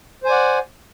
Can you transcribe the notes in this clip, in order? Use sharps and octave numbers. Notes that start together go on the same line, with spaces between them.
C5 D5 F#5 G#5